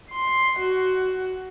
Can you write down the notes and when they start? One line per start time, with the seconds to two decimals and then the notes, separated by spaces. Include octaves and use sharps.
0.11 C6
0.59 F#4